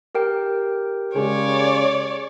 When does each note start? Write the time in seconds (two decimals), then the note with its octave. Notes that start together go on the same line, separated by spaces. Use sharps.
0.15 G4 A#4 G5
1.16 C#3 G#3 C#5 D5